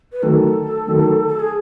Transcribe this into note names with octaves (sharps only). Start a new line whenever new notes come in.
B4
D#3 F#3 A3 A4
D#3 F#3 A3
A4
G#4